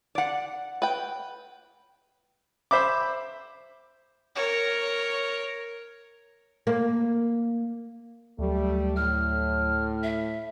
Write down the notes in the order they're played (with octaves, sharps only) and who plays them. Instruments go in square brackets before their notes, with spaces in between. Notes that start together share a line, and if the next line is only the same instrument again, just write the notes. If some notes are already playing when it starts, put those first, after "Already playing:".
[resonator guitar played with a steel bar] D5 F#5
[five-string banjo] B4 G5
[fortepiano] C5 E5 B5 D6
[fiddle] A#4 C#5
[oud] A#3
[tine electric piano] D2 F#3 [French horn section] G3 A3
[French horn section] A2 [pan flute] F6
[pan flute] E5